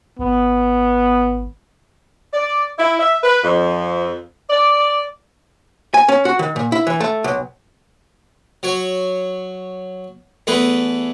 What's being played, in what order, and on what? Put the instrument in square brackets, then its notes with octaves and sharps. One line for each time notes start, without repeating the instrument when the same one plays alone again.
[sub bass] G#1 [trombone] B3
[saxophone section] D5
E4
E5
B4
F2
D5
[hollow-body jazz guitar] G#5
C#4
F#4
D#3
A#2
E4
E3
A3
B1
[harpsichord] F#3 C#5
E2 A3 G#4 B4